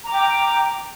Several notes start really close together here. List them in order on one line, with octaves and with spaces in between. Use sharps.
A#5 D6 G5